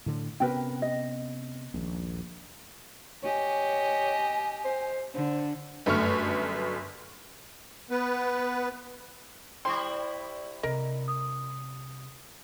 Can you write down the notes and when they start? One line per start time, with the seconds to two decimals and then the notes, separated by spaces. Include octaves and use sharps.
0.06 A2 D3
0.40 C3 B3 C#4 A#4 B4 G5
0.82 D#5
1.74 D#1 A#1
3.24 G4 C#5 D#5 G#5
4.65 C5
5.14 D3 C5
5.86 G1 F#2 A3 C#6 F6
7.90 B3 B4
9.65 G3 E4 C5 G5 C6 C#6
10.63 C3 A#4 D#5
11.08 D#6